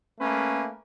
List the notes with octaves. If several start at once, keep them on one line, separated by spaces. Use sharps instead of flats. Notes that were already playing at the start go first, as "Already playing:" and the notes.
A3 A#3 C#4 B4